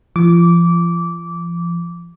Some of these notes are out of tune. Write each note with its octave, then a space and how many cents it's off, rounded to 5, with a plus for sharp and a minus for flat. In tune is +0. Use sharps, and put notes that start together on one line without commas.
F3 -35 D6 -15